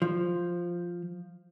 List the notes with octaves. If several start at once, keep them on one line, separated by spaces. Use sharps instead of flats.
F3